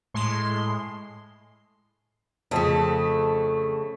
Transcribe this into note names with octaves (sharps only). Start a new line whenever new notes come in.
A2 G#3 C6
F2 C#3 F3 A3